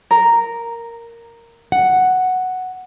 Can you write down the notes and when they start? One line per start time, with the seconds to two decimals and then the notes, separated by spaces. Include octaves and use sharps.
0.11 A#4
1.72 F#5